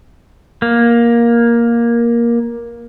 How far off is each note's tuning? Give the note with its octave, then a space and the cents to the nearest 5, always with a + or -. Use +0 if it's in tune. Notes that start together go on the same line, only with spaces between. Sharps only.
A#3 +10